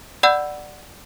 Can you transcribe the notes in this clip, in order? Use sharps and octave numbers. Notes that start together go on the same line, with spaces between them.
D5 F#5 B5 E6 G6